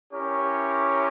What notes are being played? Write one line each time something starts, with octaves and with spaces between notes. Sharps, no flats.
C#4 E4 G4 A#4 C#5